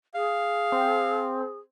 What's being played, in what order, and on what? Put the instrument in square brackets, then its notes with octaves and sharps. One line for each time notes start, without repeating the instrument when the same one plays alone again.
[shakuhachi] G#4 [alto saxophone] F5
[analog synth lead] C4